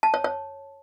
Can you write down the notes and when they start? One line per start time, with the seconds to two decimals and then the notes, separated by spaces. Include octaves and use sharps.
0.03 A5
0.14 C#5
0.24 C#5